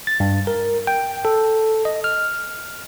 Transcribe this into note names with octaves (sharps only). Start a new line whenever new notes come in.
A6
G2
A#4
G5
A4
D#5
F6